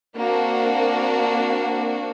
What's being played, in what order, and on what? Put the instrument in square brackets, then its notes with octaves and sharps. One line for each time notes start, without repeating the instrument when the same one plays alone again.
[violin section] A#3 C4 D4 F#4